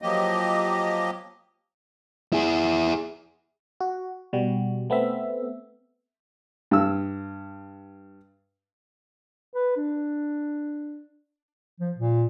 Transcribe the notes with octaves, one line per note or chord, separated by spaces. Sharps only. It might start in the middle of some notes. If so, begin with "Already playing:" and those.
F3 F#3 A#3 G4 D#5
E4 G#4
F#4
B2 G3 F#4
A3 B3 C4 E5
G2 E6
B4
D4
F3
A#2